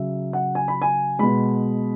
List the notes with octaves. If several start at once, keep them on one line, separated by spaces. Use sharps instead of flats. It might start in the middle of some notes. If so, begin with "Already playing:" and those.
Already playing: C#3 F#3 E5
F#5
G#5
B5
G#5
B2 G#3 B5